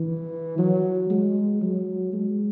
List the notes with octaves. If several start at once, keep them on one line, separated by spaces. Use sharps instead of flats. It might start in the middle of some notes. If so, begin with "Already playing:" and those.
Already playing: E3
F#3
G#3
F#3
G#3